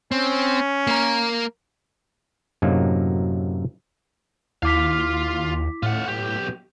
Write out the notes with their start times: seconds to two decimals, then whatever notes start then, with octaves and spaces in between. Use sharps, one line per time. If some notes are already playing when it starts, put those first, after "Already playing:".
0.12 C4 C#4
0.87 A#3 A#4
2.62 F#2 A2 C3 F#3 A#3 D#4
4.63 D#2 E4 F4 F5 D6 B6
5.83 A2 F4 F#5
6.08 B1 G4